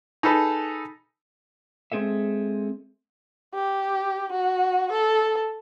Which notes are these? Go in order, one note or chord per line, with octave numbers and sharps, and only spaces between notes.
D#4 G#4 A4 B4
G#3 C4 G#4 A4 E5
G4
F#4
A4